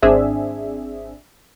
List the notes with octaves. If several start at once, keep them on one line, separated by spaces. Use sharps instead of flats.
G#1 C4 D4 G#4 E5